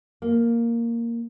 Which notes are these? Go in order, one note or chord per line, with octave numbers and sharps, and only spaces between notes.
A#3